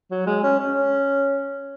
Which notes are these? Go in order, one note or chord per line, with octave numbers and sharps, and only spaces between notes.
F#3
G#3
C#4
C#4